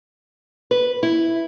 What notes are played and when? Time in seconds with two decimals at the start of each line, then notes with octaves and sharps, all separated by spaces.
0.71 B4
1.03 E4